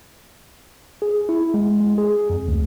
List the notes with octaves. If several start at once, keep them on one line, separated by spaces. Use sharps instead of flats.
G#4
E4
G#3
G#3
G#4
F2
D2